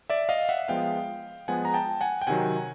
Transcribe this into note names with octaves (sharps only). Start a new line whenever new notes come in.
D5 E5
D#5 F5
E5 F#5
F3 G#3 B3 F5 G5
F3 G#3 B3 F#5 G#5
A#5
G5 A5
F#5 G#5
G5
C3 D#3 F#3 F#5 G#5